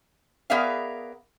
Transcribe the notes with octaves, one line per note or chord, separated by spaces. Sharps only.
B3 G#4 A#4 D5 E5 F5